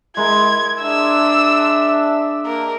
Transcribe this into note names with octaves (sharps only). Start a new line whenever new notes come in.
G#3 E4 A#4 G#6
D4 E5 E6
A#3 A#4